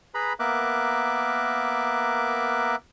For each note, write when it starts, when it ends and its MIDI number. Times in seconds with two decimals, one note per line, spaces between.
0.14 0.33 68
0.14 0.33 71
0.14 0.33 82
0.14 0.33 83
0.40 2.76 58
0.40 2.76 59
0.40 2.76 70
0.40 2.76 76
0.40 2.76 86
0.40 2.76 90